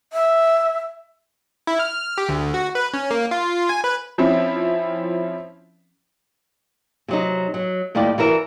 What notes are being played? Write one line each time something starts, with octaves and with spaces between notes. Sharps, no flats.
E5
E4
F6
G4
D2
F#4
B4
C#4
A#3
F4
G#5
B4
F3 C4 C#4 E4
C3 F#3 D#4
F#3
D#2 A2 G3 F4 G4 D5
E3 F#4 A#4 E5